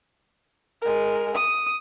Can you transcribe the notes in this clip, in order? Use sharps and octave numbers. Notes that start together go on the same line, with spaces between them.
G#3 A#4
D#6